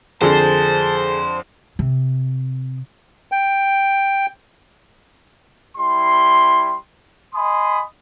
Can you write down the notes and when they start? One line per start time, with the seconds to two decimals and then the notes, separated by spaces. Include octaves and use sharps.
0.21 F2 D3 G#4 A4 C5 A5
1.79 C3
3.32 G5
5.76 G3 E4 C6
7.34 D#5 G#5 B5 C6 D#6